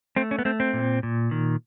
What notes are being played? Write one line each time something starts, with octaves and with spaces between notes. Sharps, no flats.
A3 C4
C#4
B3
A3 C4
C4
A#2
A#2
D#3